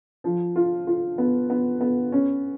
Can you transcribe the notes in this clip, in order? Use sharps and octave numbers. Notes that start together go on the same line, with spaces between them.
F3
F4
F4
B3
B3
B3
C#4